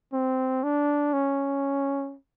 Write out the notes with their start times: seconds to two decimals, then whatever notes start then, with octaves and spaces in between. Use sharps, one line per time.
0.13 C4
0.63 D4
1.13 C#4